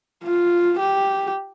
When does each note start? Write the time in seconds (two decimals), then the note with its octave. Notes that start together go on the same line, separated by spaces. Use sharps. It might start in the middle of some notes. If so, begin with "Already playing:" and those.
0.24 F4
0.79 G4